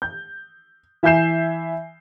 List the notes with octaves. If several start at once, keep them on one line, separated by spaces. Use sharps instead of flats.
G6
E3 E5 G#5 G6 C7 E7